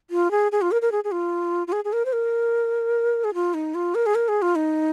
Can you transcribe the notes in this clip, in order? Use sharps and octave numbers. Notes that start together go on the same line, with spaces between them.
F4
G#4
G#4
F4
A#4
A#4
G#4
G#4
F4
F4
G#4
G#4
A#4
C5
A#4
G#4
F4
D#4
F4
A#4
G#4
A#4
G#4
F4
D#4